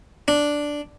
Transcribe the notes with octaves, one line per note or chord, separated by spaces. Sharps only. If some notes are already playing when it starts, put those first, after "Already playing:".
D4